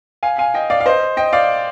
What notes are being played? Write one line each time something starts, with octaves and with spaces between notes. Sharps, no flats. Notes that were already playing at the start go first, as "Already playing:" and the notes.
F5 G#5
F5 G#5
D#5 G5
D5 F5
F5
C5 D#5
D#5 G5
D5 F5